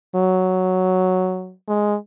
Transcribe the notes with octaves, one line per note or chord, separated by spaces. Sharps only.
F#3
G#3